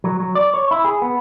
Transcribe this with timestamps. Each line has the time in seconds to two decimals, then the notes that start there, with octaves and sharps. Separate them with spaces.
0.04 F#3
0.20 F#3
0.35 D5
0.54 C#5
0.71 E4
0.85 G#4
1.02 B3